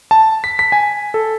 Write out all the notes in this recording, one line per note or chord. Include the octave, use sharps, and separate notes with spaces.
A5
B6
B6
G#5
A4